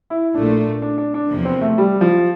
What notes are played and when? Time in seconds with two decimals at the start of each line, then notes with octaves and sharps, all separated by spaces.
0.10 E4
0.34 A#1 A#2 A3 D4
0.82 D4
0.98 D4
1.14 D4
1.30 E2 C3 F3 A#3
1.45 C4
1.61 A3
1.78 G3
2.01 F3